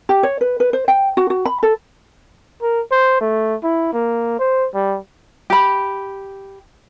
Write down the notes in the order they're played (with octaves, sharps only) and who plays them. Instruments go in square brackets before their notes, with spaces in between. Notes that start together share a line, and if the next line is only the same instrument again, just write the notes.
[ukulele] G4
C#5
B4
B4
C5
G5
F#4
F#4
B5
A4
[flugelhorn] A#4
C5
A3
E4
A#3
C5
G3
[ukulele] G4 B5